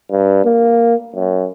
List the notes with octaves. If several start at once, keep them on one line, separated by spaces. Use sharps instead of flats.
G2
A#3
F#2